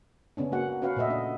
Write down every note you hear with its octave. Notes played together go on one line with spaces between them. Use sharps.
C#3 B3 C#4 D4
A#3 F#4 F#5
C#4 F#4 B4 F5 F#5
A#2 A3 B4 D#5 E5
D4 D#5